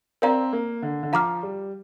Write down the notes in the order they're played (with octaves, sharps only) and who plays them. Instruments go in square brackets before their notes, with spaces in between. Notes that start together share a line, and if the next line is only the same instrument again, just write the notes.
[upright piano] C4 [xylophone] A#4 D5 F5 A#5
[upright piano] A#3
D3
D3
[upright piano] F3 [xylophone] F5 A#5 D6 F6
[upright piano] G3